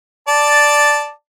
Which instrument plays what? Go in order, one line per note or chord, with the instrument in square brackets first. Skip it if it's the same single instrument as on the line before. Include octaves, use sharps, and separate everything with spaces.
[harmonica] D5 A5